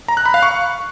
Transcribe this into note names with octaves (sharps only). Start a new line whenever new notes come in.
A#5
F#6
B5
F5
C#6